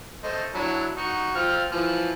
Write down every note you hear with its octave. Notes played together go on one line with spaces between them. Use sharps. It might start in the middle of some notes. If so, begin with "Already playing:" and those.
A3 C5 D#5
F#3 D4 E4
D#4 F#4
C4 F4 F6
E3 F3